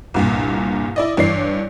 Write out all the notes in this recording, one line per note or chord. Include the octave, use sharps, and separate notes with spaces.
C2 G2 A#2
E4 D5 D#5
G2 E3 C#5 D5 C7